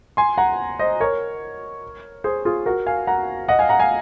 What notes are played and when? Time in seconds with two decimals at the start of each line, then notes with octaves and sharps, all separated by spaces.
0.17 G#5 C6
0.38 F#5 A#5
0.79 C5 D#5
1.00 A#4 C#5
2.24 G#4 C5
2.45 F4 G#4
2.66 F#4 A#4
2.86 F5 G#5
3.07 F#5 A#5
3.48 D#5 F#5
3.59 F5 G#5
3.69 F#5 A#5
3.80 F5 G#5